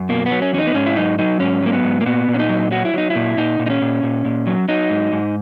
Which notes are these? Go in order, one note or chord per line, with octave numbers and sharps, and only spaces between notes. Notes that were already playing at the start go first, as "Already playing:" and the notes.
Already playing: F#2
B2 A#3
B3
F#3
C#4
E2 C#4
D#4
B3
G#2 C#4
E4
F#3 D#4
F#3 D#4
G#2 C#4
F#3 A#3
B3
G#2
A#3
A#2 B3
A#2
C#4
D#4
F#3
F#3 F#4
E4
F#3 D#4
E4
A#2
A#2 D#4
A#2
D#4
C#4
A#2
A#2
A#2
F#3
F#3 D#4
G#2
G#2